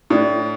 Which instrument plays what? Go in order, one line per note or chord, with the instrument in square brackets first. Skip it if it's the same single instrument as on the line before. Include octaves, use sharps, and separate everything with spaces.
[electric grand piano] A2 [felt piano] D4